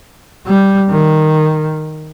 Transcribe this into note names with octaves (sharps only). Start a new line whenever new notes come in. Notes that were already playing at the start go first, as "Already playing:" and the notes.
G3
D#3